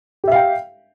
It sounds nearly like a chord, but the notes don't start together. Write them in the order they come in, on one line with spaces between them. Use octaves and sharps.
G4 E5 F5 G5